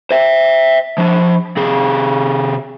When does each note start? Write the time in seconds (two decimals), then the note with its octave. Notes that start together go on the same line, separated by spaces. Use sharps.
0.11 C5 E5
0.98 F3 D4
1.57 C3 G#4